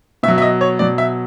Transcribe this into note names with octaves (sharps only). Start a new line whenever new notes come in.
B2 E5
F#3
E5
D#5
C#5
B2 F#3 D5
E5